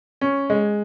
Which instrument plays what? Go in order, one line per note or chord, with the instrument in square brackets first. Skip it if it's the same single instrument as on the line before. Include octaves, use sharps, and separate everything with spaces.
[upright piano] C#4
G#3